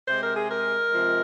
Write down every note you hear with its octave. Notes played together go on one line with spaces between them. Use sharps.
C3 G#3 C5
A#4
G#4
A#4
C3 F3 G#3